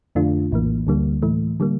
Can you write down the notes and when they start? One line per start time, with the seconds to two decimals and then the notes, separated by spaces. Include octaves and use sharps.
0.15 F2 D3 A3 D4 F4
0.52 A#1 A2 E3 A#3
0.87 D2 D3 G3 A#3
1.22 A2 E3 A3
1.60 D3 G3 A#3